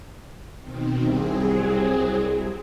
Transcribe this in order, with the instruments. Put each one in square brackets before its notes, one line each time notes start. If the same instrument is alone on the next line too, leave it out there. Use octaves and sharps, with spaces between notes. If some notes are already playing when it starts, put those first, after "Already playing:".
[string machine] B2 D#3 C4
[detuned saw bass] C2 [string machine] F#3 C4 G#4